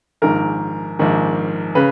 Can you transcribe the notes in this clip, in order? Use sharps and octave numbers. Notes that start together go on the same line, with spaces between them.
A#1 G#2 D#3 A#4
A#1 G#2 D#3
C#3 B4